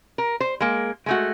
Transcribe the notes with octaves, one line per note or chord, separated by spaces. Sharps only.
A#4
C5
G#3 A#3
G#3 A3 F#4